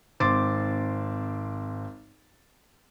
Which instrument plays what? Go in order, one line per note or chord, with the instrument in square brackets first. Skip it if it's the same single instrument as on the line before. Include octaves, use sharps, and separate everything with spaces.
[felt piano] G#1 C4 C6 D6 A6